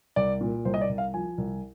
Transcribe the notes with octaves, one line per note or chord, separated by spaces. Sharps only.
C2 D5
A#2
C2 C5
D#5
D5
C2
F5
F3 G#5
C2